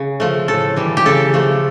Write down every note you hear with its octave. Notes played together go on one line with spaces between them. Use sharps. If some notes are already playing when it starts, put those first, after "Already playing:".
Already playing: C#3
F3 A3
A2 A4
E3 G3
G4
C#3 A4
F3 A3